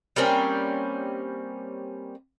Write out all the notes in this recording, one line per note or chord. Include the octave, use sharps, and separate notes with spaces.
G3 A#3 C4 C#4